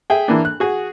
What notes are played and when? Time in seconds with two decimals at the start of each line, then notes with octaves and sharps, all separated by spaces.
0.10 G#4 E5 G5
0.28 E3 A#3 D4
0.45 F#6
0.60 F#4 G#4